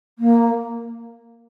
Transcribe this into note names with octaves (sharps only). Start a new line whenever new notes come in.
A#3